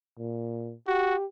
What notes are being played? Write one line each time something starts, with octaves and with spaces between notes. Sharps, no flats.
A#2
F#4 G4